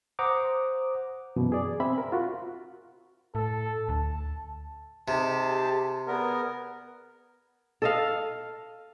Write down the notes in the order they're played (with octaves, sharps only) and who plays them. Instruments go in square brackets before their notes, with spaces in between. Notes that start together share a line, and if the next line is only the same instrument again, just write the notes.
[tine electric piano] C5 F#5 A#5 D6 D#6
[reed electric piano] F#2 B2 E3
G#4 D5
C4 E5 B5
A#4
F4 F#4
[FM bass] A2 [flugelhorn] A4
[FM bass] D2 [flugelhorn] A5
[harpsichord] C3 [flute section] D#4 G4 G#4 [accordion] A5
[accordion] B3 A#4 [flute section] G#4 D5
[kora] A4 D#5 F5